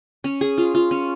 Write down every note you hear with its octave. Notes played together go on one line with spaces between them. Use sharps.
C#4
G#4
F4
F4
C#4